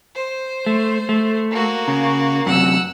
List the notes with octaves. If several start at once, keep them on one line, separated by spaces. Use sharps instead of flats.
C5
A3
A3
A#3 F#4
C#3
F#2 C3 F#5 E6